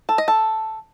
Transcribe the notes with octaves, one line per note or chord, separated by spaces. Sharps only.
A4
D#5
A4